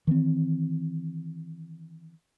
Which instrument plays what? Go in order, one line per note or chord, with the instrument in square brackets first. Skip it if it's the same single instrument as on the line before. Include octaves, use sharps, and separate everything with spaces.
[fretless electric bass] D#3 E3 B3 C4